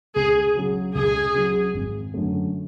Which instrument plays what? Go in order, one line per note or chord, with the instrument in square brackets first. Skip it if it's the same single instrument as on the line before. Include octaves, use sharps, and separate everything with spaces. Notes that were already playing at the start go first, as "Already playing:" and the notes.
[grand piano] C#2 [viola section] G#4
[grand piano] C#3 F#3
[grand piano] C#2 [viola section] G#4
[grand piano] C#3 F#3
G#1
F#2 D3 F#3 A3